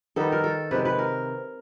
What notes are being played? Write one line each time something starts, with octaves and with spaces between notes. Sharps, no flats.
D#3 G3 B3 D#4 A4
A#4
A4
C3 D#3 G#3 B4
B4
A#4